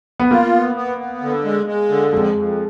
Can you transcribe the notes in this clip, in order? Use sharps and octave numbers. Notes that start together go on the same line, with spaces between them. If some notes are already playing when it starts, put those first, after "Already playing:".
B3
A#3 F4
B3
B3
B3
D3
G#3
G#3
D3
F2 G#3
F2